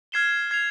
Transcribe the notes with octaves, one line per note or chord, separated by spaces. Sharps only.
F6 G#6 C7 E7 G7
G#6 C7 F7